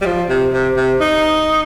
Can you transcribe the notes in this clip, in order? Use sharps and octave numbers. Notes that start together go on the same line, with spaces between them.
G3
F3
C3
C3
C3
D#4